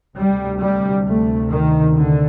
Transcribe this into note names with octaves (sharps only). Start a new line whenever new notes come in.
D2 C3 G3
G3
A3
D#3
D3